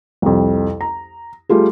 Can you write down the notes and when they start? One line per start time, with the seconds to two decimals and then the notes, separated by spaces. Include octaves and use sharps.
0.22 C2 F2
0.81 A#5
1.49 G3 A3 F4 G#4